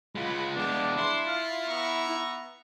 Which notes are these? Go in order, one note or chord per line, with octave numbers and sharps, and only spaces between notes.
G#3 F4 F#5 B5
G#3 B3 D4 D5 G5 A5
E4 C6
F4 F5
B3 E5 A#5 C#6